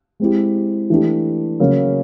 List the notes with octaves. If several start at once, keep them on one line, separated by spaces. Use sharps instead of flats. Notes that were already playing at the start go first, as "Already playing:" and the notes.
G#3 C4 E4 G4
E3 A3 D4 G4
C#3 F#3 A#3 C#4